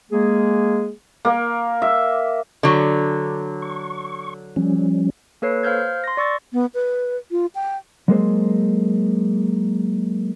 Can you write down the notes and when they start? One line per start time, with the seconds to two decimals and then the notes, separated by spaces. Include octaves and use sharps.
0.11 G#3 A#3 G#4
1.25 A#3
1.82 E5
2.63 D3 F#3
3.62 C#6
4.56 F3 G3 C#4
5.42 A#3 A4 B4 C#5 C7
5.63 C5 F5 F6 G6 G#6
6.04 C6 A#6
6.17 D5 C#6 E6 A6
6.53 B3
6.74 B4
7.31 F4
7.55 G5
8.08 F#3 G#3 A#3 G#4 A4 C5